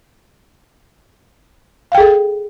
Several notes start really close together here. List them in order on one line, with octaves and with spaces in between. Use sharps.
F5 G5 G#4 A4